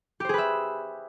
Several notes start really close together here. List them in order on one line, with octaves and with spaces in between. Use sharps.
G4 C5 G#4 B4 E5